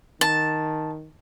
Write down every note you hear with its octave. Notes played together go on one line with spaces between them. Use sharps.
D#3 A5